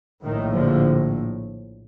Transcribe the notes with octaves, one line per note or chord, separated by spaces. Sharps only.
A#1 A2 D#3
D3 F3